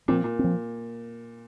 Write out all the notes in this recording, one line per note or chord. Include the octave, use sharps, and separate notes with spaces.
A#2 F3 C4
A#2
C4
F3